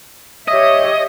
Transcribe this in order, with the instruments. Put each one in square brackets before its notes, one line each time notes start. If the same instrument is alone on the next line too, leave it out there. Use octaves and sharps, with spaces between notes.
[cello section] G4 C#5 E5 [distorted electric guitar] D#5